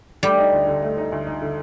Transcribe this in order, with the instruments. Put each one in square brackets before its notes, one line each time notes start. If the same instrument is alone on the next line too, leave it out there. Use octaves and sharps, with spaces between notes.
[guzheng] G3 [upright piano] A3
[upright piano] D#4
D2
D3
A3
D#4
D2
D#4
D3